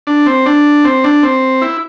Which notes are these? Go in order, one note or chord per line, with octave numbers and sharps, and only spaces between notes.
D4
C4
D4
C4
D4
C4
E4